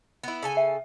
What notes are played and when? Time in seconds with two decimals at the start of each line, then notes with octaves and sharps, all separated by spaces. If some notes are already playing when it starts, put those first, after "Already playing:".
0.23 B3 E4
0.43 C#3 A4 G#5
0.57 E5